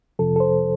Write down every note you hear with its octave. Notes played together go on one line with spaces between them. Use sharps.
F2 C3 F3 A4
A4
C5